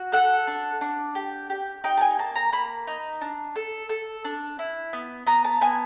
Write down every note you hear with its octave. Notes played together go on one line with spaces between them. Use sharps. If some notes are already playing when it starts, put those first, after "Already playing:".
Already playing: F#4
A4 F#5
D4
D4
G4
G4
D#4 G5
A5
G#5
A#3 A5
A#5
A#3 B5
D#4
D4
A4
A4
D4
E4
B3
B3 A#5
A5
B3 G#5